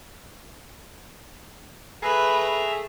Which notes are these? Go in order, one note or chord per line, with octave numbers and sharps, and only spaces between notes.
A3 G#4 B4 E5 A#5